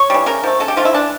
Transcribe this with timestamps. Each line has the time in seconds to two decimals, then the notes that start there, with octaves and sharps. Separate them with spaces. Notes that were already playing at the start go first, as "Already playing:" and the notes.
Already playing: C#5
0.10 E3 G3
0.26 C#3 A#4
0.44 F3 A3
0.60 C#3 A4
0.68 G4
0.77 F3 A3 F4
0.85 E4
0.94 E3 D4